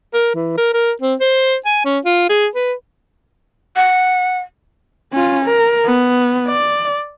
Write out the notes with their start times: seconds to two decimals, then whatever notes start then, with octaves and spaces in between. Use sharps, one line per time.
0.14 A#4
0.35 E3
0.58 A#4
0.74 A#4
1.02 C4
1.20 C5
1.66 G#5
1.85 C#4
2.05 F4
2.29 G#4
2.55 B4
3.76 F#5
5.13 C#4 F4
5.45 A#4
5.86 B3
6.48 D5